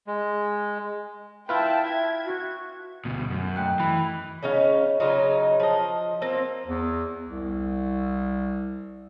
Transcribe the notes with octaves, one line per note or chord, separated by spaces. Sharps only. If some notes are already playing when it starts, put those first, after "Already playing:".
G#3
E4 F4 B4 E5 G5 A5
G#6
F#4
D2 B2
F#2
A3 G5 F#6
E3 B5
C#3 C#4 D#4 F5
C#3 F#3 D#4 F4
F3 D#5
A#3 C4 F4
E2
C2